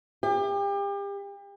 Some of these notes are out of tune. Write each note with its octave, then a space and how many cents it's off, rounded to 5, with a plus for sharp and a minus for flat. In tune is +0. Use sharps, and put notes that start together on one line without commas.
G4 +35